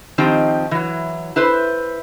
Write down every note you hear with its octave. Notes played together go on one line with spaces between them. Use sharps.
D#3 F3 C4 D#4 G4
E3 F#3
E4 B4 C5